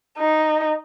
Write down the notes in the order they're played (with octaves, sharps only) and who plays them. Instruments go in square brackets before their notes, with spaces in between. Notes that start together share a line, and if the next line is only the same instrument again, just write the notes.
[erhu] D#4